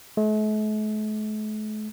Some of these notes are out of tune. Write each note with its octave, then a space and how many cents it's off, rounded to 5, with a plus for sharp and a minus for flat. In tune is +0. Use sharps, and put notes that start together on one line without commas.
A3 -45